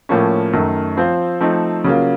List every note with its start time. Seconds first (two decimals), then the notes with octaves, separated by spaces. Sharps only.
0.09 A2 F3 A#3 C#4
0.53 F#2 D#3 A3
0.97 F3 C4 F4 C5
1.41 F3 A3 C4 D#4
1.84 C#3 F#3 A#3 F4